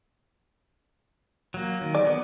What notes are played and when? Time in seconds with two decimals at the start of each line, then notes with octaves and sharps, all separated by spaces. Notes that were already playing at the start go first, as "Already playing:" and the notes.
1.54 F#3 A#3
1.81 D#3
1.95 D5
2.07 B3